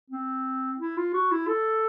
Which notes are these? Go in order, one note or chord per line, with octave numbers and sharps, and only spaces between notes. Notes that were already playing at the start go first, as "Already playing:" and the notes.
C4
E4
F4
F#4
E4
A4